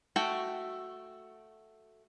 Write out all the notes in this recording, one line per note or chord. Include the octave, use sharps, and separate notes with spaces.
A3 F#4 G5